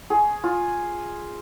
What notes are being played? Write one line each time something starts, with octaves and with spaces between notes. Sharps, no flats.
G#4
F4